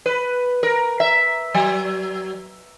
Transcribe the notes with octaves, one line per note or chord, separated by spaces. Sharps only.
B4
A#4
E5
F#3